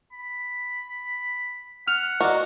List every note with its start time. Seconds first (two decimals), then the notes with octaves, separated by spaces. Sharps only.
0.13 B5
1.87 F#5 F6 F7
2.21 F#4 A#4 D5 D#5